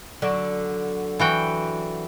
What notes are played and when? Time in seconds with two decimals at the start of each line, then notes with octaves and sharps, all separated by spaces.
0.22 D3 F#3 D5
1.19 E3 F#4 G5